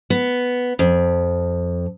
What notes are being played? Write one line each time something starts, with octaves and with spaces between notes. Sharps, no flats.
B3
F2